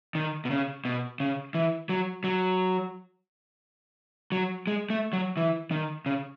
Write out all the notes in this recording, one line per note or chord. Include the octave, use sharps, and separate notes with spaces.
D#3
B2
C#3
B2
C#3
E3
F#3
F#3
F#3
G#3
A3
F#3
E3
D#3
C#3